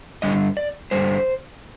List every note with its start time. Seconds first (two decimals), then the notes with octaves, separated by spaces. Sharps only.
0.22 G2 D3 G3 D#5
0.57 D5
0.91 G2 D3 G3 C5